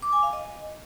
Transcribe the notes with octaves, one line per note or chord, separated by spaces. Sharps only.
D6
G#5
F5
D#5